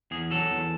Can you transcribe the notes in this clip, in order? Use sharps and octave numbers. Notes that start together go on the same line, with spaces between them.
E2 G#4
F#3 A4
E2